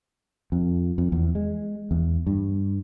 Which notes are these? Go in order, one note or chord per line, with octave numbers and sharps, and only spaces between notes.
F2
F2
E2
G#3
E2
G2